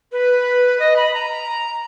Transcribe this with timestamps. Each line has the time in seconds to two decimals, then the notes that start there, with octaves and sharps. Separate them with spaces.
0.11 B4
0.79 D#5
0.96 B5
1.13 A#5